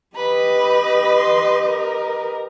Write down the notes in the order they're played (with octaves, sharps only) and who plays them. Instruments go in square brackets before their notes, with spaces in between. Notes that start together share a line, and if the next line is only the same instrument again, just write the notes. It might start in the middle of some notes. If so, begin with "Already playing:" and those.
[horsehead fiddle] G4 D#5 [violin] B4 [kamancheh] B5
[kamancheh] C6
A#4